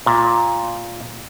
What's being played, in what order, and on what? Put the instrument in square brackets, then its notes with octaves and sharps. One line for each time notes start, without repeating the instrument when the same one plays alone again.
[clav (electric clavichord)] A#2